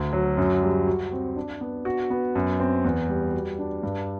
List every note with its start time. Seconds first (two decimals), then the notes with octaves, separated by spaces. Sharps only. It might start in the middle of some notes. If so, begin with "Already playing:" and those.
Already playing: D2
0.13 F#3
0.37 F#2
0.63 G3
0.87 F#4
1.12 C4
1.36 D4
1.61 B3
1.85 F#4
2.10 B3
2.35 F#2
2.60 C4
2.85 E2
3.09 G3
3.34 F#4
3.59 D4
3.83 G2